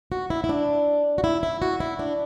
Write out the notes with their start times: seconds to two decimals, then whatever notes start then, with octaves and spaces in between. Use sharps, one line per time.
0.12 F#4
0.30 E4
0.44 E4
0.49 D4
1.18 F#4
1.24 E4
1.43 E4
1.62 F#4
1.80 E4
1.99 D4